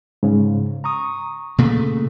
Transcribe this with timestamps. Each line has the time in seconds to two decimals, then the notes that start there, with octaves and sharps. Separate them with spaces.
0.23 G#2 C#3
0.84 A#5 C#6 D#6
1.58 A#2 C#3 A3